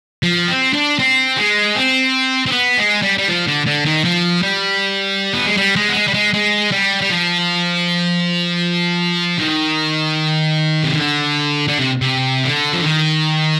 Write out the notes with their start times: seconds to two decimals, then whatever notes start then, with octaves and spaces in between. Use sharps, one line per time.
0.23 F3
0.48 C4
0.74 D4
0.99 C4
1.37 G#3
1.75 C4
2.46 C4
2.52 B3
2.78 G#3
3.02 G3
3.18 G3
3.28 F3
3.47 D3
3.66 D3
3.85 D#3
4.04 F3
4.42 G3
5.34 B3
5.46 G#3
5.57 G3
5.76 G#3
5.89 B3
5.95 G#3
6.07 G3
6.14 G#3
6.34 G#3
6.71 G3
7.01 G3
7.09 F3
9.39 D#3
10.83 C3
10.91 D3
11.68 D3
11.79 C3
12.01 C3
12.44 D3
12.73 F3
12.83 D#3